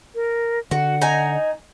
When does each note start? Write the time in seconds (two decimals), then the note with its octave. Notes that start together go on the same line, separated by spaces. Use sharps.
0.15 A#4
0.71 D3 F#4 F#5
1.02 D#4 G#5